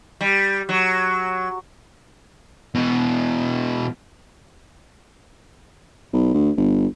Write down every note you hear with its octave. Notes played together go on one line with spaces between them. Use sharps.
G3
F#3
B2 E3
B1
D2
G1